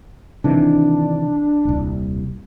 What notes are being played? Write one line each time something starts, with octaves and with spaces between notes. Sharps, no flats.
C3 D#3 E3 D4
D#1 C2